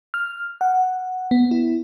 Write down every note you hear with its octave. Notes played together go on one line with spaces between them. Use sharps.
F6
F#5
B3
E4